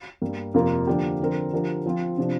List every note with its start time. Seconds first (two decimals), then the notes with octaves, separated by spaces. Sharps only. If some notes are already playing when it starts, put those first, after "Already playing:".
0.21 G2 G3 A#3
0.54 F2 C3 A#3 F4 A#4
0.87 D3 F3 A#3 D4 G4
1.20 D3 F3 C4 A#4
1.53 D3 F3 D4 G4 A#4
1.86 F3 C4 F4
2.18 C3 F3 D4